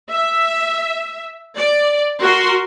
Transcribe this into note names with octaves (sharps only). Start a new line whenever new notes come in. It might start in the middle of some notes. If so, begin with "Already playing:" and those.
E5
D5
F#4 A#4 C6